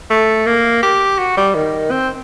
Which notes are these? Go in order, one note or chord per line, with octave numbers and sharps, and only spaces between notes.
A3
A#3
G4
F#4
G3
D#3
C4